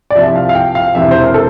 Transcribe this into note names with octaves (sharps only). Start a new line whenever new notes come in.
D5
C2 C3 F3 E5
F5
F5
G5
F5
E1 E2 C3 E3 E5
C5
A#4
A4